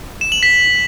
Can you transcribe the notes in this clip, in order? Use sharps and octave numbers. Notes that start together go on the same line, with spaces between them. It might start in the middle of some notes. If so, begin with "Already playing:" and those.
E7
F#7
B6